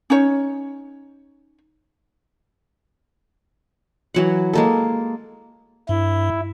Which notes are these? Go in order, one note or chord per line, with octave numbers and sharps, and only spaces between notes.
C#4 D#4 C#5
E3 F#3 F#5
G#3 A#3 A4
G2 E4